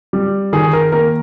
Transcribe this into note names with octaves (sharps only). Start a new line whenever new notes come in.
G3
D#3 G#4
A#4
A#3 A#4